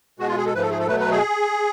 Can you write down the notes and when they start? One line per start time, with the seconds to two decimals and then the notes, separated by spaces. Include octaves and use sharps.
0.19 B2 G#3 F#4
0.28 F4
0.37 G#4
0.46 A4
0.54 G#2 F3 A3 B4
0.63 A4
0.70 G#4
0.79 A4
0.88 B2 F#3 A3 B4
1.00 B4
1.11 G#4